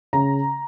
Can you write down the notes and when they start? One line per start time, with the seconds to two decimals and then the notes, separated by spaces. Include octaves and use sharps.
0.13 C#3 A#5